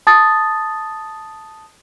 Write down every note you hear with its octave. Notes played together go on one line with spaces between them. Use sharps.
A5 D#6 A6